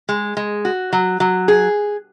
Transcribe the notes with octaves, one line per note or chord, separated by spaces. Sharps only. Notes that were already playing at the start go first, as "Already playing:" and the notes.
G#3
G#3
F#4
F#3
F#3
G#4